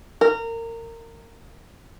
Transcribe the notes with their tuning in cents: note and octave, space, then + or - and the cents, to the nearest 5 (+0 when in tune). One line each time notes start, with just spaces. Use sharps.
A#4 -25